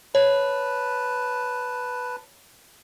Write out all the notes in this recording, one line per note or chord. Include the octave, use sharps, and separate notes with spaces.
B4 C#5 A5